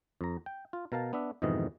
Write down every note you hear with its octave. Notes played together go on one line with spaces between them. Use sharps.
F2 A#5
G5
F4
B2 A#4 F5 A5
B3 D4 E5
F2 G#2 B2 D#3 E3 D#5